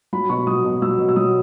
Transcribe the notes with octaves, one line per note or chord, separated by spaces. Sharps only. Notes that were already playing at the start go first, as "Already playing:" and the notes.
F#3 B5
B2 C#6
F#3 D#6
B2
F#3 E6
B2
E6
F#3 D#6